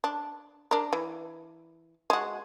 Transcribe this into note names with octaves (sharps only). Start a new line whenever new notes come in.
D4
D4 A#4
E3
G#3 F#4